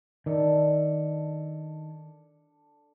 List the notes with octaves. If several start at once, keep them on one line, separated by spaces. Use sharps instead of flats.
D#3 D4 A4